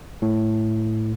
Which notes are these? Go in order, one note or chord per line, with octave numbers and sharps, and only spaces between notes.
A2